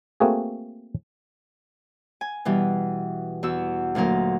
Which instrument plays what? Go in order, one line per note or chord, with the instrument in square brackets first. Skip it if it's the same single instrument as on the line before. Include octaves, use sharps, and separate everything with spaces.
[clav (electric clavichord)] A3 A#3 C4 F#4 G#4
[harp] G#5
B2 E3 G3
E2 F#4 E6
D2 A#2 F#3 A#4